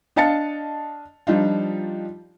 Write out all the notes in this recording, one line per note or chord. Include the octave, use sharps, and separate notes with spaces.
D4 D#5 F5 A5 A6 C#7
F3 G3 D4 D#4 F4